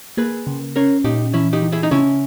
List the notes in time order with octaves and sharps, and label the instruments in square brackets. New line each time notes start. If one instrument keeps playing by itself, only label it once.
[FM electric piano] A#3 [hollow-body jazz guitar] G#4 B4
[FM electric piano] C#3
[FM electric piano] C#4 [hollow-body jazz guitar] A#4 C#5
[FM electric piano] A#2 [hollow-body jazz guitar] D#4 G4
[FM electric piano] E3 [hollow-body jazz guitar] C#4 E4
[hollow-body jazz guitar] D#4 G4
[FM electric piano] E3
[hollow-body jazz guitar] E4 G#4
D#4
[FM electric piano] C#3 [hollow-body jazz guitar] C#4 E4